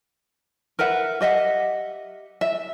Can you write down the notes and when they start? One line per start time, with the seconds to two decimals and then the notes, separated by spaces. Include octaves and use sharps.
0.79 A#4 B4 E5 F#5
1.21 G4 D#5 E5 F#5
2.41 E5